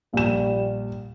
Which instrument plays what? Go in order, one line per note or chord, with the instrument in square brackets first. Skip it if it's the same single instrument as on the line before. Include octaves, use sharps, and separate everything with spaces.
[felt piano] A#1 E7 [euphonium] G3